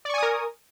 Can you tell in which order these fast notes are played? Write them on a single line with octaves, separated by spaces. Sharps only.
D5 C#6 G#5 D#6 A#4